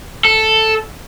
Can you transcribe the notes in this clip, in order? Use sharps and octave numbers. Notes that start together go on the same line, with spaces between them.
A4